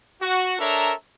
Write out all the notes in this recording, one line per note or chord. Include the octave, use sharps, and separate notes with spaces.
F#4
D4 A4 A#4 C#5 E5 A#5